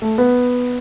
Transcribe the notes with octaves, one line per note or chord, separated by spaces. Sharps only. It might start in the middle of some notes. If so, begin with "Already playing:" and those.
A3
B3